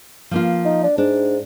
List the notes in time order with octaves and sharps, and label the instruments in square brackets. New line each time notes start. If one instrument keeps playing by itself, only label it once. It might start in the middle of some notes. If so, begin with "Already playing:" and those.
[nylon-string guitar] F3 A#3 F4
[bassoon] D#4
D4
[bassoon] G#2 [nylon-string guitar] D4